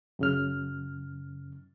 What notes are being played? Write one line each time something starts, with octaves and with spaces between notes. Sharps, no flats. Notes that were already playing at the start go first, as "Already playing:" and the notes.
F#2 C#3 F6